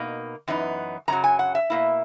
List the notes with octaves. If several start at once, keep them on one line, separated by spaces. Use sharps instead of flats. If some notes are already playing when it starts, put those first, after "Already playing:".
Already playing: B2 A#3 D#4
F#2 E3 B3 D#4
F#2 C#3 F#3 A#5
G#5
F#5
E5
B2 A#3 E4